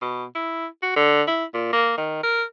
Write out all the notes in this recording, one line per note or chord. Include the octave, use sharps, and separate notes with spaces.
B2
E4
F#4
D3
E4
A#2
A#3
D#3
A#4